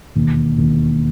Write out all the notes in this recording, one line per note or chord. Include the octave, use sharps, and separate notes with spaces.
E1 D#2 D#3
E1 D#2 D#3